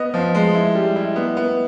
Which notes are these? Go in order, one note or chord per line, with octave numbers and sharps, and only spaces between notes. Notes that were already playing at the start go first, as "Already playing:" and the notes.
Already playing: B3 D#5
F3
G#3
E4
G3
E4
B3
B3